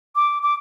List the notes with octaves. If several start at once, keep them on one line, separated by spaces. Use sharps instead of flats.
D6
D6